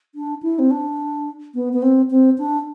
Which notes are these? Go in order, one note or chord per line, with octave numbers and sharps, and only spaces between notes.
D4
E4
C4
D4
B3
B3
C4
C4
D4